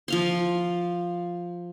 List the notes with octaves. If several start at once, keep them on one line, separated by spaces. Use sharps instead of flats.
F3 F5 C6